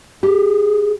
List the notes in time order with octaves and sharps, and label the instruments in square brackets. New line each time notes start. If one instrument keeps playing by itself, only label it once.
[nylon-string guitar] G4 [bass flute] G#4